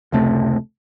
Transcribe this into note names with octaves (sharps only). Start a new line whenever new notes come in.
F1 C#2 C3 A3